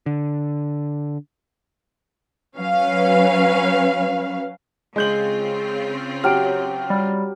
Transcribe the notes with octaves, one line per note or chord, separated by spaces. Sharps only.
D3
F#3 C#4 B4 F5
C#3 G#3 C4 F4 G6 F#7
F#3 G4 F6 D7
G3